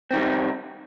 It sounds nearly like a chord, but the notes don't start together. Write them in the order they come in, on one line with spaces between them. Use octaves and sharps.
C4 D#3 G3 C3